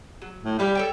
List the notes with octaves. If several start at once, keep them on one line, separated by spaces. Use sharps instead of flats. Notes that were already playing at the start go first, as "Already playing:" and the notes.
F#3
A2
G3 G4 B4 F5
A4 C#5 G5